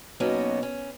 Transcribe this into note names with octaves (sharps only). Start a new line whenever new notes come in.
B2 F#3 A#3 B3 C#4 D#4
C#4